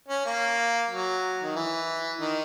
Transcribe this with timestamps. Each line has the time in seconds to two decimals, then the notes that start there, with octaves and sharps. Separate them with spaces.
0.08 C#4
0.25 A#3
0.90 F#3
1.43 D#3
1.56 E3
2.20 D#3